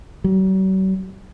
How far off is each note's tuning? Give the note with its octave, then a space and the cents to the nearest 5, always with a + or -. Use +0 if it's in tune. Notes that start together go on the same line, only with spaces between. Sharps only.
F#3 +45